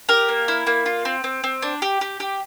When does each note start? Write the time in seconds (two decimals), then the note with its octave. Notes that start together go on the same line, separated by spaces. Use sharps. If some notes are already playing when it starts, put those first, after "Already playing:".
0.09 G4 A#4
0.29 A#3
0.48 E4
0.67 A#3
0.86 F4
1.05 C4
1.24 C4
1.44 C4
1.62 D4
1.82 G4
2.01 G4
2.20 G4